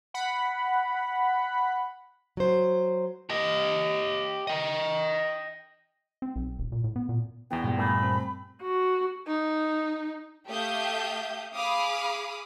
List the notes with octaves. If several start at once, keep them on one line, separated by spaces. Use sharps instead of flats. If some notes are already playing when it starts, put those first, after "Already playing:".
F#5 B5
F#3 C5
G4 D#5
D#5 G5
C4
B1
D#1
A#2
A2
B3
A#2
E2 E3 B3 G5
G2 A#2
A3 A#3 G#4 B5
C4
F#4
D#4
A3 G4 E5 F5 D#6 G6
G#4 F5 B5 D6 D#6